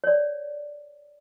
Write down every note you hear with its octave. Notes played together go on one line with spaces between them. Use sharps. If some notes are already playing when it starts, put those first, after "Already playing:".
C#5 D5